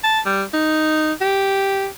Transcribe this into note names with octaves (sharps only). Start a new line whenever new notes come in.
A5
G3
D#4
G4